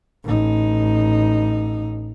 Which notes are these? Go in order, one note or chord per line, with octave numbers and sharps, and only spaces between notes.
A1 D#4